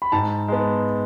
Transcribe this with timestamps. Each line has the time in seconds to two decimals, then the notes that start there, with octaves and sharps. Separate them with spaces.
0.02 B5
0.12 G#2 A5
0.48 G#3 B3